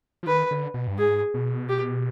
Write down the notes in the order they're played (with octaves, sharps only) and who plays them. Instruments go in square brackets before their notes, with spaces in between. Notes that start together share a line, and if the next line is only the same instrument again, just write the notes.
[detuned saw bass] F3
[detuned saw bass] D#3 [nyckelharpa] B4
[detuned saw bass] D3
B2
G2
[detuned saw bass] G#2 [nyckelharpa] G#4
[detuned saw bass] B2
[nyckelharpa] G4